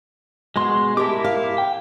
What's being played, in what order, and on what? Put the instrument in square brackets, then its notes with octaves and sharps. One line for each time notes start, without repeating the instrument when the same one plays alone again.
[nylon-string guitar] B2 F#4 [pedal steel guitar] G#3 C6
[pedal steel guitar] E4 A#4 D6 [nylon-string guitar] G4 A5
[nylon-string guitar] F5
[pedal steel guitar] G5